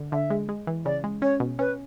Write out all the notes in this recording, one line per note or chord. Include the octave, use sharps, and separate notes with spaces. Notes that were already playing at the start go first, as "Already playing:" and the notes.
Already playing: D3
D3 E5
G#3
G#3
E3
C#3 D5
G#3
C#4 C#5
B2
C#4 B4